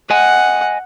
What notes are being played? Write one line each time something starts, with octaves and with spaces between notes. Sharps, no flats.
D#5 F#5 G#5